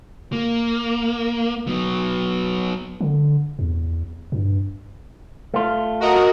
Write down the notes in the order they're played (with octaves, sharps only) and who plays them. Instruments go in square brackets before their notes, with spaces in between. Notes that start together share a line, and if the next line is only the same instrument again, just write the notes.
[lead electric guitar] A#3
F#3 B3
[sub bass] D3
E2
G2
[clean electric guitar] A3 F4
[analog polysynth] F#4 A#4 D#5